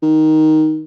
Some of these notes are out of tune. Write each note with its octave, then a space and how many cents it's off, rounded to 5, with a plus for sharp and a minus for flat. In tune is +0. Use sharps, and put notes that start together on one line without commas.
D#3 +5